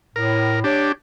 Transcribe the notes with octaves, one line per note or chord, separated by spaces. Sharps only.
A2 A#4
D4 G4 C#5